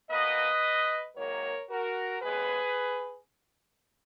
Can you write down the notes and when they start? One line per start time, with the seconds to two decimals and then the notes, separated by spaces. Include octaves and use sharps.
0.10 B2 A#3 B4 D#5
1.16 G#2 D#3 F#3 A#3 A#4 C#5
1.70 F#4 A#4
2.22 D#2 C#3 G#3 B3 G#4 B4